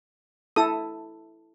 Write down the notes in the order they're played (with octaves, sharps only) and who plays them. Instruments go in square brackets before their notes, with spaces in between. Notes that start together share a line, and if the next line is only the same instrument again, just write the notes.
[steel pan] E4 A4 D#6